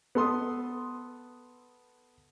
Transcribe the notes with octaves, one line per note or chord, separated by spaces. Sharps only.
B3 A4 C6 D#6